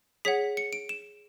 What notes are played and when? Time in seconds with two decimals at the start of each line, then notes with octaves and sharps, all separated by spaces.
0.25 G#4 C#5 F#5 B6
0.57 C#7
0.73 D7
0.89 E7